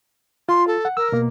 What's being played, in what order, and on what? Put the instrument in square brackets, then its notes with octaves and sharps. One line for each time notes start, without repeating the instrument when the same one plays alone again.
[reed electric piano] F4 [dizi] C6
[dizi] A4
[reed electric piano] F#5
[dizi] A#4 [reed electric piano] E6
[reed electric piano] B2 A#3